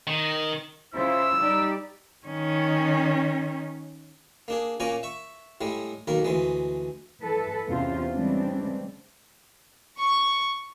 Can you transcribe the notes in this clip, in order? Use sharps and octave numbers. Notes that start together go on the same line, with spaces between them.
D#3
C#3 E4 F4 C5 E6
G3 D#4 G4 D5
D#3 C#4
A#3 D4 G#4
A#2 A#3 C#4 D5 G#5 A#5
E5 C#6
A2 G3 G#3
B1 D#3 A#3 A#4
D2 E3 G#3
E3 A4 B4
E2 C3 C#4 F4 C5
C#3 E3 G3 G#3 C4 D4
C#6